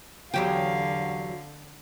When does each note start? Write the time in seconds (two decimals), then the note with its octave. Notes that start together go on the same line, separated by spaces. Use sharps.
0.34 E2 D3 F#3 G4 F5